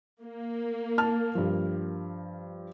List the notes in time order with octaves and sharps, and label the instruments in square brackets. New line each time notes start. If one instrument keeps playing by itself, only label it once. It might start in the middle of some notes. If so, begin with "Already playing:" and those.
[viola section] A#3
[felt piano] A5 F6
G2 F3